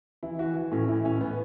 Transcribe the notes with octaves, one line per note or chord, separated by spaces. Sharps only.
E3 E4
E3 F#4
E3
A2 C#4
E3 E4
A2 C#4
A2 B3